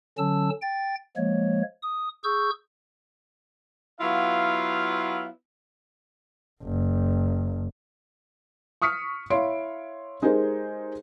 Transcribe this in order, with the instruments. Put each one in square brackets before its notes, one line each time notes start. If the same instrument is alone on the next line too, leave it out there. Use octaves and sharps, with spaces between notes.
[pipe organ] D3 F#3 C#4 A5 E6
G5 A6
F3 G#3 A#3 C#5
D#6
G#4 C#6 E6 G6
[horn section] F#3 B3 E4 F4 F5
[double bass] F#1
[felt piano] C#6 D#6 F6 B6 C#7
E4 C#5 F5 C6 D7
G#3 D#4 G4 G#4 A#4 C5